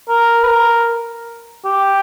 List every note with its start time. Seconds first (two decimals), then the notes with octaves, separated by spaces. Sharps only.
0.09 A#4
0.44 B4
0.48 A#4
1.65 G4